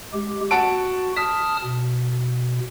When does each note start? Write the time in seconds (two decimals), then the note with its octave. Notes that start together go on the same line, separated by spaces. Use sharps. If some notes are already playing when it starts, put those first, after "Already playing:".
0.14 G#3 G4
0.51 F#4 F#5 A5 D7
1.17 A5 D#6 F6 B6
1.64 B2